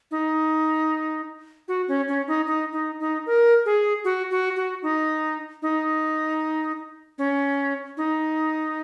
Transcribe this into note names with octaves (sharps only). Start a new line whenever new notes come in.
D#4
F#4
C#4
C#4
D#4
D#4
D#4
D#4
A#4
G#4
F#4
F#4
F#4
D#4
D#4
C#4
D#4